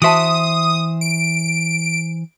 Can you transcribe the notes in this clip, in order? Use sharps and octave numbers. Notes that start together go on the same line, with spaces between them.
E3 F#4 C5 E5 A5 D#6
D7